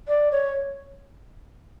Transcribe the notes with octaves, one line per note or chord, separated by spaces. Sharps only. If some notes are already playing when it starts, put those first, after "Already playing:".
D5
C#5